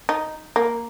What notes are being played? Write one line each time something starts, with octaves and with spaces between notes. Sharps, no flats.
D#4
A#3